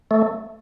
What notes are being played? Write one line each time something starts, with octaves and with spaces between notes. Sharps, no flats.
A3